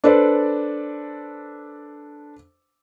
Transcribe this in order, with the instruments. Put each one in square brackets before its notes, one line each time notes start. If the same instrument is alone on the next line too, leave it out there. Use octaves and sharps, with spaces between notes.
[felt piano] D4 A4 B4 C5 D5